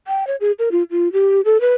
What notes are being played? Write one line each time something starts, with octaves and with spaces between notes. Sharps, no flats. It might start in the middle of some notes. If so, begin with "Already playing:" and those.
G5
C#5
G#4
A#4
F4
F4
G4
A4
B4